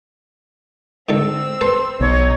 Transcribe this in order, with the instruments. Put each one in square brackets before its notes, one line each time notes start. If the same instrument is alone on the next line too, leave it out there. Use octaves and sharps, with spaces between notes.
[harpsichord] G#2 D3 A4 [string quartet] C4 E6
[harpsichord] A4 B4 C5 [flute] C6
[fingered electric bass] B1 [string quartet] D#4 [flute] C#5